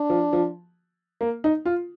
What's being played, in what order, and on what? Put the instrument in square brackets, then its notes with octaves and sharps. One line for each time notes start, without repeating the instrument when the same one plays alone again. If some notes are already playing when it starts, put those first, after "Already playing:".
Already playing: [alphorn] D4
[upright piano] F3
F3
A#3
D#4
F4